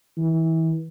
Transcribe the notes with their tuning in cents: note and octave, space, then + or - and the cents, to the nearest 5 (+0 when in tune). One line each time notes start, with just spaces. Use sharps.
E3 -30